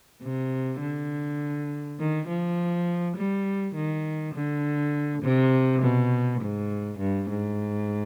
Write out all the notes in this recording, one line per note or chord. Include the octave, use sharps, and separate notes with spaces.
C3
D3
D#3
F3
G3
D#3
D3
C3
B2
G#2
G2
G#2